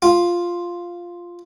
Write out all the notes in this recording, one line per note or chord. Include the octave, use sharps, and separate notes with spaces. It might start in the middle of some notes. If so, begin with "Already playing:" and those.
F4